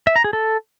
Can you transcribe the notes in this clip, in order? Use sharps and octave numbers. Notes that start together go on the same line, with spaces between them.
E5
A#5
G#4
A4